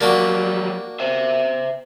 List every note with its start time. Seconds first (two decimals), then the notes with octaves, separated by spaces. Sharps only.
0.01 F#3 G3 A#3 D4 F#4
1.00 C5 E5